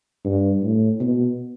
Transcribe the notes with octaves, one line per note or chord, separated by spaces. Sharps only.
G2
A2
B2